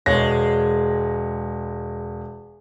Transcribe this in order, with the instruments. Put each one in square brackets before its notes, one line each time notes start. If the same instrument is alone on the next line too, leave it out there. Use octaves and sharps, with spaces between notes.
[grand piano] E1 C#5 A#6 [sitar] G#3